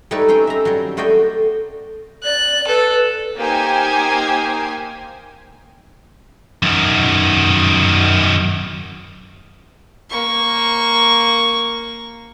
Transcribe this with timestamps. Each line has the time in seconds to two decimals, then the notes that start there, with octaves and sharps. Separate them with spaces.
0.11 G3 A3 D#4 E4 B4 D5
0.28 C4 C#4 C5 G5
0.47 E5 A#5
0.65 F#3 G3
0.97 A3 F#4 C5 D5 D#5 G5
2.24 D5 F#6
2.68 A4 B4
3.36 A#3 D#4 G4 C5 G5 G#5
6.63 F#2 D#3
10.10 A#3 C#6